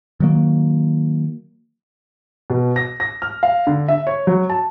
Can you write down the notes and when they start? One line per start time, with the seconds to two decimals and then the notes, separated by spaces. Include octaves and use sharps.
0.20 D#3 F#3 A#3
2.50 B2
2.76 A#6
3.00 A#6
3.22 F6
3.43 F5
3.67 D3
3.88 E5
4.07 C#5
4.27 F#3
4.50 A5